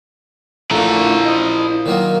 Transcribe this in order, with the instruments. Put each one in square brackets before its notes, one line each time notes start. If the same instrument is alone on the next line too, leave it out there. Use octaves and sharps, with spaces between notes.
[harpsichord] A#1 A#2 [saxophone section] D3 A3 [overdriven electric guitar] E4 A#5
[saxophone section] F3 D#5
[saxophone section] A#2 A#4 [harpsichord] D#3 F#3 A#3